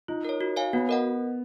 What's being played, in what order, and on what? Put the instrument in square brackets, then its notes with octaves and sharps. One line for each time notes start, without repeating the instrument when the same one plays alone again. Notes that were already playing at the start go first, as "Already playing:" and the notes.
[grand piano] D#4 [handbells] F4
[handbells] A#4 C#5
F#4
C#5 F5 G#5
[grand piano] B3 [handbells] F#4
[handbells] A#4 D#5 F#5